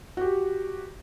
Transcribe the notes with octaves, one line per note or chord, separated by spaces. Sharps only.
F#4 G4